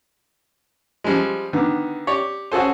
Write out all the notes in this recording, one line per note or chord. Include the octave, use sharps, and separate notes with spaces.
F3 G3 G#3
D3 D#3 B3
G4 C#5 D5
C#4 F#4 G#4 A4 C5